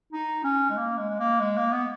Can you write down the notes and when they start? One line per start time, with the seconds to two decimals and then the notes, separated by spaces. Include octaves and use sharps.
0.13 D#4
0.44 C#4
0.70 G#3
0.77 A#3
0.98 G#3
1.09 G#3
1.19 A#3
1.40 G#3
1.57 A#3
1.72 B3